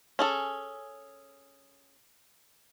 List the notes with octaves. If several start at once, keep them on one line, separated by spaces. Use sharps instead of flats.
C#4 G#4 A4